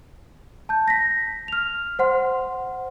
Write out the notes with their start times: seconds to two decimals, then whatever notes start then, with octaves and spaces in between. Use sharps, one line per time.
0.69 A5 G6
0.88 A#6 B6
1.48 F6 F7
1.99 C5 F#5 C6